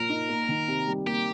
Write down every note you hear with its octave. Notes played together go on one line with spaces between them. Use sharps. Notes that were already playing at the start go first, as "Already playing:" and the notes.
Already playing: A#2 F3 A#4
D#4
A#3
D#3
C3
G3
A#3 G4